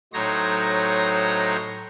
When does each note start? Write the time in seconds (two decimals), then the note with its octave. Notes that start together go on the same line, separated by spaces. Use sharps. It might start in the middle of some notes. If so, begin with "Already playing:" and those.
0.13 A2 F#3 D#4 C5 C#5 A#6